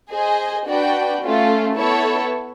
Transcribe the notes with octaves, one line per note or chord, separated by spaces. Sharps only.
G#4 C5 D#5 G#5
D4 F#4 B4 D5 G5
A3 C#4 F4
B3 E4 A4 C#5